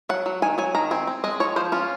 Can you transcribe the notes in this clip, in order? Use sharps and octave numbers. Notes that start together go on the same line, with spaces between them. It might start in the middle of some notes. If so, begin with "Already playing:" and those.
F#3 F#5
F#3
D#3 G#5
F#3 G#5
D#3 A#5
C4 G#5
C4
G#3 D#5
F3 C#5
F3 C5
C#4 F4